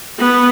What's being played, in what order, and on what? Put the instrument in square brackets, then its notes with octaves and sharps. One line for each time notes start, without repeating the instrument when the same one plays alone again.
[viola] B3